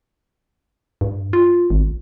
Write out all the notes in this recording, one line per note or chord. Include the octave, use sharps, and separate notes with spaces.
G2
F4
G#1